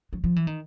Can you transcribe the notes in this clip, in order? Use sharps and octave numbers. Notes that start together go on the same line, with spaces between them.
F#3
F3
E3
D#3